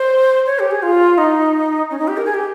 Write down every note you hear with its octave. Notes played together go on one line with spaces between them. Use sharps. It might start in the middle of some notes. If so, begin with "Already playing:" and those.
Already playing: C5
C#5
G4
G#4
F4
D#4
C#4
D#4
G4
A#4
G#4
G4